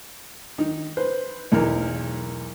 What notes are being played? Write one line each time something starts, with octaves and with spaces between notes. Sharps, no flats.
D#3 D#4
B4 C5
B1 E2 A#4